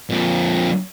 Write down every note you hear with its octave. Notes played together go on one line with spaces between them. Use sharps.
F2 A#2